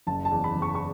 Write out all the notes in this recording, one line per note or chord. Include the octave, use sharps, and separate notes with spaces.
F#1 A5
A5
E2
B5
F#1
C#6
C#6